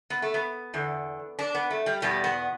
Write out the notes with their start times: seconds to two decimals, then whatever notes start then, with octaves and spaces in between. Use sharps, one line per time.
0.10 B3
0.22 A3
0.34 B3
0.74 E2 D3
1.39 D4
1.55 B3
1.71 A3
1.86 G3
2.02 E2 B2 G3
2.24 B3